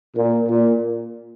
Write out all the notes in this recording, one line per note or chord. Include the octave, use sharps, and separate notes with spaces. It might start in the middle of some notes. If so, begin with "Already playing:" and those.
A#2
A#2